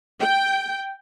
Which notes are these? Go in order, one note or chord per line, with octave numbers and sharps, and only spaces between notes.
G5